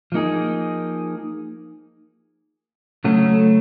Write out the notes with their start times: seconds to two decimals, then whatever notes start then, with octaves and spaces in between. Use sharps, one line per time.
0.12 F3 A#3 D#4 G#4
3.04 C#3 F#3 A3 C#4